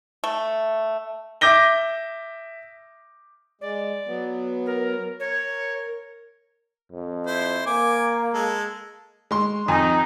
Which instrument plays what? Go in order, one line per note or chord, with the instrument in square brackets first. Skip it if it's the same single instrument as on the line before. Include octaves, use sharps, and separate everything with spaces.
[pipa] A3
[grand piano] E5 D6 G6 A#6 G7
[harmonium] G#3 [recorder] D5
[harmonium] F#3 B3
[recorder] A#4
[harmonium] A#4 [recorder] C#5
[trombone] F2
[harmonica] E4 C5
[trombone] A#3 [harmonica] G#5 D6
[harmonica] G#3 A4
[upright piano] G#3 C6
[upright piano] F2 G#5 [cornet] D#4